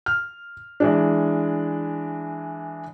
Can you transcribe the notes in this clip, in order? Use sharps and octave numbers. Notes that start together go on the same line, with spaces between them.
F6
E3 G#3 D4